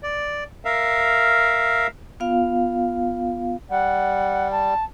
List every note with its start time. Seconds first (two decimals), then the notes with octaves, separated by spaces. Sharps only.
0.03 D5
0.65 A#4 E5 F5
2.20 B3 F4 F5
3.70 G3 F#5
4.51 A5